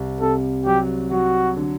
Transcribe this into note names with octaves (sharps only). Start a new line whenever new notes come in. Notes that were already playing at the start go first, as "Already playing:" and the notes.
Already playing: C2
C3 A4
F#3 G4
F#3 F#4
D3